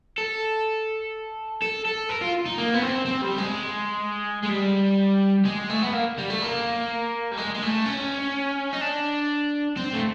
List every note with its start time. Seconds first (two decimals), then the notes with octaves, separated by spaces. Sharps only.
0.18 A4
1.62 A4
1.85 A4
2.09 A#4
2.22 F4
2.46 D#4
2.58 A#3
2.74 B3
2.82 C4
3.06 C4
3.22 G3
3.38 G#3
4.43 G#3
4.49 G3
5.45 G#3
5.70 A3
5.82 B3
5.93 A#3
6.18 G3
6.30 A3
6.42 A#3
7.31 G3
7.37 G#3
7.55 G#3
7.62 A3
7.86 C#4
8.73 D#4
8.81 D4
9.77 C4
9.93 A3